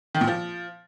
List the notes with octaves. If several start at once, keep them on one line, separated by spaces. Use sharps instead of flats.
D#3
A#2
F3